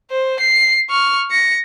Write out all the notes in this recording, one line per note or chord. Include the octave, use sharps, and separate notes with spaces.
C5
C7
C#6 F6
A#6 C#7